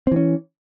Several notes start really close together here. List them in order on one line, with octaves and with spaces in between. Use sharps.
C4 E3 C#4